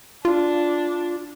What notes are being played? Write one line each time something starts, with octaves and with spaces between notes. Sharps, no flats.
D4 F4